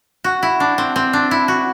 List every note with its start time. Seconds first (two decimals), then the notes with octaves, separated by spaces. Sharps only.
0.24 F#4
0.43 E4
0.60 D4
0.78 C4
0.96 C4
1.13 D4
1.31 E4
1.48 F#4